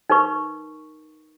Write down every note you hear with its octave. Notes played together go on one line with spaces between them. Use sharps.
D#4 A#4 B4 C#6